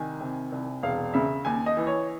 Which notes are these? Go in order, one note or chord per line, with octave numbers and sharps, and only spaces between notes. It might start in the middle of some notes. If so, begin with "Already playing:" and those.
Already playing: C2 D#3 G#5
C3
C2
E1 F5
C#3 E5
D#2 G#5
D#5
E3
C#5